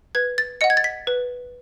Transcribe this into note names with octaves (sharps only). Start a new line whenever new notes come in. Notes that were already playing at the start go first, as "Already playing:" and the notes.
B4 G#6
A6
D#5 F#5 C#7
G#6
A6
B6
B4